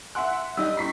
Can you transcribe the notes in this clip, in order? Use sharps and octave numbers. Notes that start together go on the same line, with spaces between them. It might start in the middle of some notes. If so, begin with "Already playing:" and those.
E5 F#5 G#5 C6 F#6
G3 D#4 D#5 E6
C#4 E4 B5 C#6 B6 C7